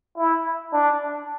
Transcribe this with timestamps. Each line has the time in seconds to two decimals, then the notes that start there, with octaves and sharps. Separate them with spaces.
0.18 E4
0.73 D4